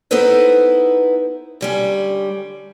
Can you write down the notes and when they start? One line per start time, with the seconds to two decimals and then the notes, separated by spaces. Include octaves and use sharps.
0.11 B3 D#4 E4 A4 B4 C5
1.61 D3 G3 C#4